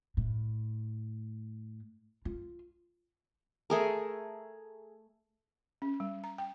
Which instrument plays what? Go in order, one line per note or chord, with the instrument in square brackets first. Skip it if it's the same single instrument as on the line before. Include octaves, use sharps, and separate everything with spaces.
[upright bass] A2
F4
[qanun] A3 G#4 A#4
[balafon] C#4
G3
A#5
G5